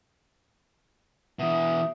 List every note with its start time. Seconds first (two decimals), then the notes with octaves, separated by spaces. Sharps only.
1.39 B2 E3 E5 D#6